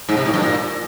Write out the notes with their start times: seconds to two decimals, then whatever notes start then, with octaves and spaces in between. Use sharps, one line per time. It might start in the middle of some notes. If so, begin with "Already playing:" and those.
0.09 G#2
0.17 C3
0.25 A2
0.34 G2
0.42 A#2